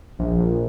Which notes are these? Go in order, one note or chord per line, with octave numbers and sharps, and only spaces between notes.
A#1
A#1